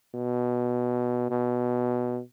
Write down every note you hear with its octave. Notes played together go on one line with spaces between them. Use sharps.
B2
B2